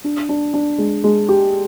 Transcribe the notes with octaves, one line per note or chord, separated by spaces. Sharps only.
D4
D4
D4
G#3
G#3
G4